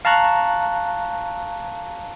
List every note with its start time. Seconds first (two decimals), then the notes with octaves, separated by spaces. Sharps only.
0.05 F5 A5 A#5 C#6 F#6